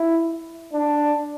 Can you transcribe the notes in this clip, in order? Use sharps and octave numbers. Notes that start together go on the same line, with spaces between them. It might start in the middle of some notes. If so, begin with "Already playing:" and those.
Already playing: E4
D4